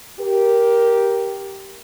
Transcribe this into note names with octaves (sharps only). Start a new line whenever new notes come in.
G4 A#4